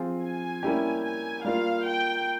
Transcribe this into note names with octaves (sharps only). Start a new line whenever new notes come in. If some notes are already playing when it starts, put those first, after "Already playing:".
Already playing: F3 C4 F4 G#4
G#5
G3 A#3 C#4 E4 G4
G#5
G3 A#3 F4 F5
G5